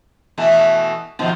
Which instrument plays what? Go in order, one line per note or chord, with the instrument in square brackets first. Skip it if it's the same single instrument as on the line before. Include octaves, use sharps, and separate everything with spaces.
[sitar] B2 E3 A3
B2 D#3 F3